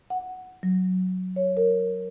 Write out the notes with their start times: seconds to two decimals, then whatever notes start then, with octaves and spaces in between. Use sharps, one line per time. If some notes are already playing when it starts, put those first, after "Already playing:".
0.10 F#5
0.63 F#3
1.36 C#5
1.57 A#4